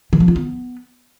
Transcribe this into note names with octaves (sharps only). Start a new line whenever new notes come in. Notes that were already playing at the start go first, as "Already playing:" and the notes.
D#3
F3
F4
B3